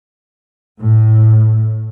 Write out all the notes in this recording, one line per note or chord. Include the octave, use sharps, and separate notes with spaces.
A2